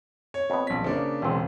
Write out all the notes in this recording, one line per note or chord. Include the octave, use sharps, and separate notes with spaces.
C#5
F2 B3
A#1 B6
C#3 A#3 D4 C5
E1 C#2 C#3 C4